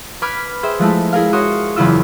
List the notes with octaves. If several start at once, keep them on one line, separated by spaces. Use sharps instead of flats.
B4 B5 D6 F6 G#6
G#4 C5 E5 G5
F3 G#3 A3 E4
E4 G#4 A#4 F5
F#4 A#4 C#5 C6 D#6
F#1 E2 C#3 E4 F4 E6